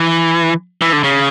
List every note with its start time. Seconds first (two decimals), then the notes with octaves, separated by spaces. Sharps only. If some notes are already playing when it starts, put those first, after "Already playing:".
Already playing: E3
0.81 E3
0.93 D3
1.03 C#3